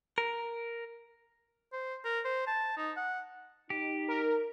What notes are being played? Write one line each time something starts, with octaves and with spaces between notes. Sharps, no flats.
A#4
C5
A#4
C5
A5
D#4
F#5
D#4 G4
A#4